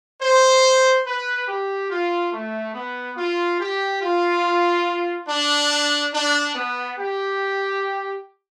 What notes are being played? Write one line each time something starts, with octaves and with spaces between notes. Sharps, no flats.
C5
B4
G4
F4
A3
B3
F4
G4
F4
D4
D4
B3
G4